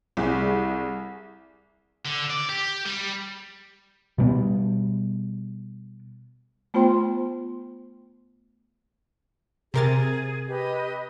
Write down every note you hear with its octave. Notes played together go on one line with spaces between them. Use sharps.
C2 G3 G#4
D3
D5
G4
G3
B2 G3 B3
A3 B3 F4 C5 G5 C6
C3 G#4 A#4 A6
G4 B4 D#5